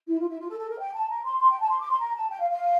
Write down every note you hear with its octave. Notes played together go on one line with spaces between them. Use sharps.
E4
F4
E4
F4
A4
A4
A#4
G5
A5
A#5
C6
C6
G5
A5
C6
D6
C6
A#5
A5
G5
F5
F5